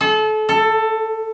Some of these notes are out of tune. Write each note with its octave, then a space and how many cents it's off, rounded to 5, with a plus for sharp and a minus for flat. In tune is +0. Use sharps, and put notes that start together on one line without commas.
A4 -30
A4 +15